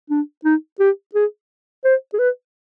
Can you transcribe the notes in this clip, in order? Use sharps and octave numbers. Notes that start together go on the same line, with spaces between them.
D4
D#4
G4
G#4
C5
G#4
B4